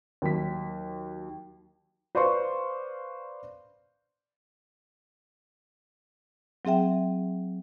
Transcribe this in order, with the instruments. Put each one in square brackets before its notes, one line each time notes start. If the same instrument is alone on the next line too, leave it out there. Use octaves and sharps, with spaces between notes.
[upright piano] D#2 F#3 B6
[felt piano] B4 C5 D5 F5 C6 C#6
[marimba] F#3 C4 G#4 E5 G5